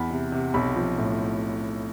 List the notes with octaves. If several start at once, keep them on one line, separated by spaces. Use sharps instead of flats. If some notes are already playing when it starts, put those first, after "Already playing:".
Already playing: E2 B5
C3
C3
B1 B5
F3
A2